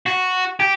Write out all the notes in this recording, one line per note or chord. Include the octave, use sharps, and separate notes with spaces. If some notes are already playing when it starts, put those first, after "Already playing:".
F#4
G4